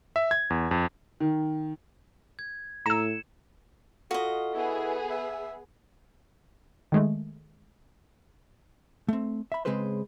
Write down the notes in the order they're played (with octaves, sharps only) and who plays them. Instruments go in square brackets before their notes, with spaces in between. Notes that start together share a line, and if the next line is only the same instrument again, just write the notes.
[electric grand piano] E5
G#6
E2
F2
[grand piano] D#3
[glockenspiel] G#6
[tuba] A2 [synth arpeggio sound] A#5 E6 [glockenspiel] C#7 E7
[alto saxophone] F4 [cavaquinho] F#4 D#5 [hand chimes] A4
[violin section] B3 G#4 [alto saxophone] E4
[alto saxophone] E5
[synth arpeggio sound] D#3 G#3 A3
[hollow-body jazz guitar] A3 C4
E5 B5
C#3 G#3 C4 G#4 B4 C5